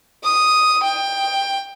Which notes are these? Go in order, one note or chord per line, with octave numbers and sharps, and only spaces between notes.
D#6
G5